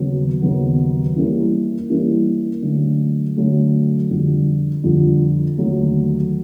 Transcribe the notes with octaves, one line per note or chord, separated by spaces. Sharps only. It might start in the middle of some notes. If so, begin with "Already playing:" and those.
Already playing: D#2 C#3 F#3 B3
D#2 C#3 F#3 B3
E3 G3 A#3 C#4 E4
E3 G3 A#3 C#4 E4
D3 F#3 A3
D3 F#3 A3
F2 D3 G3
F2 D3 G3
D#2 D3 F#3 A3